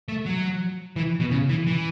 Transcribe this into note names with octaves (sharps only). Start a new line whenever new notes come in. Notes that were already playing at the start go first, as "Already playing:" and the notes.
A3
F#3
E3
B2
C#3
E3
E3